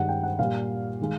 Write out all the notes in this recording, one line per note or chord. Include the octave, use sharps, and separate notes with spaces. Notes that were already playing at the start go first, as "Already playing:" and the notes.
Already playing: G2 D#3 G#3 F#5
G5
F#5
A#2 G3 F5
D#3 G#3